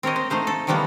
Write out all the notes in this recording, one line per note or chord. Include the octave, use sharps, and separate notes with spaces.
C4 A#4 C#5 D#5
C5
A3 D#4 C5 F5
A4
C3 D#3 F3 G3 A#3 B3